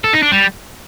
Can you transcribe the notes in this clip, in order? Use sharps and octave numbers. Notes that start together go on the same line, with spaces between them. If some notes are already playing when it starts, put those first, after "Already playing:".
A4
D#4
D4
G3